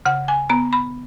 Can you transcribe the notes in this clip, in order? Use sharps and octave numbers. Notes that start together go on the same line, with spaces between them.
C#3 F#5
G#5
B3 A#5
B5